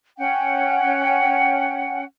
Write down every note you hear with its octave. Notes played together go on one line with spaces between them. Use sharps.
C#4 F#5 G5